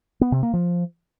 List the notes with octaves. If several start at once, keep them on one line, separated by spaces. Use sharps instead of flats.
B3
C3
A#3
F3